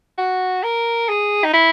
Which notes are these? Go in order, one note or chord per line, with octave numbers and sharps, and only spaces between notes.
F#4
A#4
G#4
D#4
E4